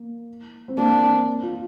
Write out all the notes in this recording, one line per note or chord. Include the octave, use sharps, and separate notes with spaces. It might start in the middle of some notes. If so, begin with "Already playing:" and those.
Already playing: A#3
C4
A#3 D4
C4
F4